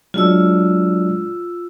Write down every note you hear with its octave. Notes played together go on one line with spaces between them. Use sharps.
F#3 G#3 D4 F4 E6